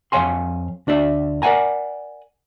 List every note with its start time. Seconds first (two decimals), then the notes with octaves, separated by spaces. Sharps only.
0.12 F2 G#2 C#5 F5 G#5 C6
0.87 D2 D4 D5 E5
1.42 A#4 D5 D#5 F#5 G#5 A#5